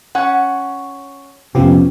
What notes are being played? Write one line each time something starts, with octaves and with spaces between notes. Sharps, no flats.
C#4 F#5
F2 C3 F3 B3 C#4 G4